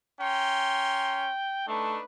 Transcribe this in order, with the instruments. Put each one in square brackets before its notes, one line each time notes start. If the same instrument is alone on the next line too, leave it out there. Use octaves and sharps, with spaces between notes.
[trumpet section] C#4 A#5 C6 [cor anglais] G5
[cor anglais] A3 [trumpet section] D4 D#4 B4